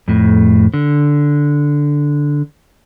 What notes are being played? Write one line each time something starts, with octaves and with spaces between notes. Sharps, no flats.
F2 A2
D3